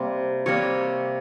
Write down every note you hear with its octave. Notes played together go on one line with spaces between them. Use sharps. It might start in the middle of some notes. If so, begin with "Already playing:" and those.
Already playing: C3 G3 A#3
C3 G3 A#3 C#5